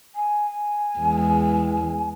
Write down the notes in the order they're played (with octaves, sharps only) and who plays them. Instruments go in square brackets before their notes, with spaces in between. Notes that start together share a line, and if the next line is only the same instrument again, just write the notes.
[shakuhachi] G#5
[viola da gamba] E2 G#3